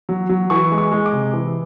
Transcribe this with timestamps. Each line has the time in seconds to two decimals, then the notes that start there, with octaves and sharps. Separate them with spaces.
0.09 F#3
0.29 F#3
0.50 E3 C#6
0.72 G#3
0.78 C#6
0.92 G#3
1.06 D6
1.13 C3
1.33 E3